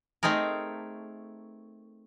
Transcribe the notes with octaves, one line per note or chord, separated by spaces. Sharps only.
A3 C4 D#4 G#4 A#4